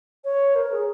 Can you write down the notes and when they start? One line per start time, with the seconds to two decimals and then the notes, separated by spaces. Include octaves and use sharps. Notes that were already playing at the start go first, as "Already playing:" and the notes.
0.25 C#5
0.55 A#4
0.72 G#4